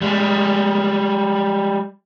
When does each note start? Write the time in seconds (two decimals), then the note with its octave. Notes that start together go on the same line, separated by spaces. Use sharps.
0.02 G3 G#3